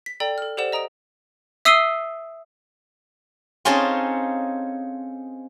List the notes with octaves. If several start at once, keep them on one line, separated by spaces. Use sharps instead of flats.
B6
A4 D5 G5 A#5
A4 F6
G4 A4 C5 D5 F#5 E7
D#5 A#5 D#6 D7 F7
E5 D#6 E6 C7 D#7 G7
C4 C#4 D#4 F4 G#4 A4